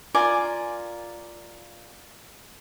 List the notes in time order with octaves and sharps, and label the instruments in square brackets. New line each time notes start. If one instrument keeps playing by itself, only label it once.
[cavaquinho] F4 A#4 D5 G#5